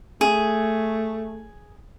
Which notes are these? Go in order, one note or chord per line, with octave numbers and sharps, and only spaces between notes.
A3 G#4